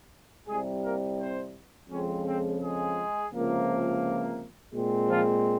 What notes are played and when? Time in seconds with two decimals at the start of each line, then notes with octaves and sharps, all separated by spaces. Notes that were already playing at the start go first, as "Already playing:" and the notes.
0.47 C2 C3 G3 G#3 G#4
0.83 A#3 A#4
1.19 C4 C5
1.89 F2 C#3 F3 G#3 C4 C#4 C#5
2.25 C4 C5
2.61 G#3 G#4
3.32 C#2 C3 F3 A#3
4.74 A#2 G#3 C4
5.09 F3 F4